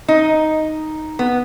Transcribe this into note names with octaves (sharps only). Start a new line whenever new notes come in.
D#4
B3